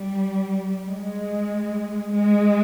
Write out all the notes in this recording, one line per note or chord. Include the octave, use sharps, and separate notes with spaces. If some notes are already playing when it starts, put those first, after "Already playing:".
Already playing: G3
G#3
G#3